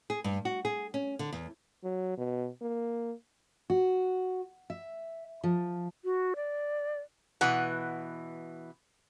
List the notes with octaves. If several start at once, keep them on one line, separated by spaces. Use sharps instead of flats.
G#4
G2
F#4
G#4
C#4
D3
E2
F#3
B2
A#3
F#4
E5
F3
F#4
D5
B2 E3 F#5